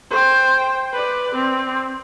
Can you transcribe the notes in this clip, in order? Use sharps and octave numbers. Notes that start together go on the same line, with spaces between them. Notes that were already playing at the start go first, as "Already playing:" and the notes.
C5 G5
B4 D5
C4